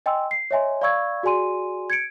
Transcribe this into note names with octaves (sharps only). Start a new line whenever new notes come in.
D#5 G5 G#5 C6 E6
C7
C#5 D#5 E5 G#5 C6
D5 F5 B5 C#6 E6 G#6
F#4 G#4 D5 G#5 C6 D#7
G#6 C#7 D7